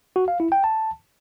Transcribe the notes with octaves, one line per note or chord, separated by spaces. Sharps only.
F#4
F5
E4
G5
A5